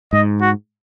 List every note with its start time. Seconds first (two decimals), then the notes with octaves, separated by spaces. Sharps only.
0.13 G#2 D#5
0.42 F#4